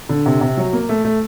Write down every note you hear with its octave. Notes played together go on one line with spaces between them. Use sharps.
D3
C3
C3
F#3
A#3
A3
A3